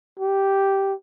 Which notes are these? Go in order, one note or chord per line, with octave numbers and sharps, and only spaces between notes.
G4